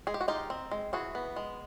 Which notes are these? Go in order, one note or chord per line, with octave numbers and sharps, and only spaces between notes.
G#3 G#4
G4
F#4
D#4 F4 G4
C4
G#3
E3 F#4 G#4
B3
G#3